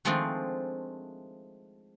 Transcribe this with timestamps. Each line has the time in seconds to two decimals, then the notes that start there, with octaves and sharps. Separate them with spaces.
0.05 D#3 F3 G#3 A3 C4 D4